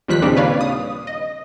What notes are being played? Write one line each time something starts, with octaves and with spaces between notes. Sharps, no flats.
D#2 D#3 F3 G3 F#6 B6
A#2 C#3 C4 D4 D#4 G4
B4 C#5 D5 F5
D#6
D#5